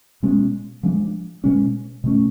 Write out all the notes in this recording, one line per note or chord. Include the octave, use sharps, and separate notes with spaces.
B2 G#3 C#4
F3 G#3 D4
B2 G#3 C#4
B2 A3 C#4